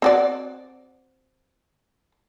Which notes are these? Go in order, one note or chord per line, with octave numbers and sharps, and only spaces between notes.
C4 F#4 D5